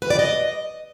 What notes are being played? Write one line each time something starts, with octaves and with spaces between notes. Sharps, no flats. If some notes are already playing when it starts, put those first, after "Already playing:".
B4
D5
D#5